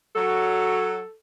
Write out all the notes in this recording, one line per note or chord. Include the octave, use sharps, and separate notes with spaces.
F#3 A4